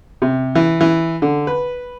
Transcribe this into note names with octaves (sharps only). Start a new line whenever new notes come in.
C3
E3
E3
D3
B4